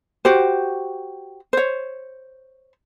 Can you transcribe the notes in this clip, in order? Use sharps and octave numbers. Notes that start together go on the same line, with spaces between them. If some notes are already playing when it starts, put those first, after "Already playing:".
F#4 G4 C5
C5 C#5